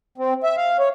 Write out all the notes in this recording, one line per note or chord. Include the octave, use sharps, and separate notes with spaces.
C4
E5
F5
C#5